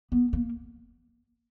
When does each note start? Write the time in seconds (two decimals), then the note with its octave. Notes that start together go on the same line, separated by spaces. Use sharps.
0.12 B3
0.33 A#3